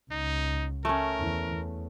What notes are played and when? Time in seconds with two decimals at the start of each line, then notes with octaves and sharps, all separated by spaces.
0.11 C#2 D#4
0.85 A3 C#4 A#4
1.18 E2 E3
1.53 E2